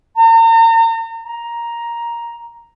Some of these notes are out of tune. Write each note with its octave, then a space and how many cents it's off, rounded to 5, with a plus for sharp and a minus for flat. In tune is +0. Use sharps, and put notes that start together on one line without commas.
A#5 -40
A#5 +10